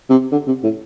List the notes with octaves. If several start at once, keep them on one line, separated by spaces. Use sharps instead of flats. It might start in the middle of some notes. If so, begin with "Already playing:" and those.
C3
D3
C3
A2